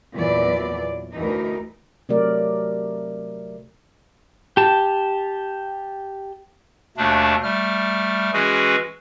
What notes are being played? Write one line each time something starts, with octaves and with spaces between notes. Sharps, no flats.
E2 A#2 E3 F#3 D5
D2 E3 D#4 A#4
C3 F#3 A3 A#4 D5
G4 A5
D#2 B2 A3 D4
G3 A3 F6
E3 G#3 C#4 F#4 G#4 B4